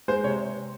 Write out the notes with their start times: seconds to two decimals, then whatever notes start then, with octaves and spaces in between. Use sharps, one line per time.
0.08 G#3 C5
0.24 C3 C#5